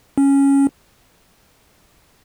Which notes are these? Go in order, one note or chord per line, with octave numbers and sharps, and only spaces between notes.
C#4